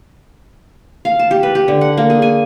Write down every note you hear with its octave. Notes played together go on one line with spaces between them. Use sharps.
F5
A5
G4
B4
G4
D3
F#5
A#3
G#4
G#5